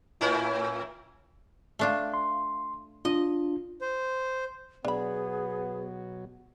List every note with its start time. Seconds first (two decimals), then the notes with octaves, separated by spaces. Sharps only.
0.21 A2 C#4 E4
1.79 A3 D4 F4
2.14 C6
3.05 D4 F4 D#5
3.81 C5
4.85 B2 F#3 B3 D4 G#4 B5